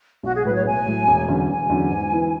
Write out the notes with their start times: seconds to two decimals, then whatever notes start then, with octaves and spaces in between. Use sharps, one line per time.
0.23 B1 F#4
0.35 G#4
0.45 A2 B4
0.49 F#3
0.55 C#5
0.65 B1 G#5
0.86 A2 F#3
1.08 E1
1.28 E2 D3 F#3 C#4
1.49 E1 G#5
1.70 E2 D3 F#3 C#4
1.90 G#2
2.11 E3 B3 E4 B4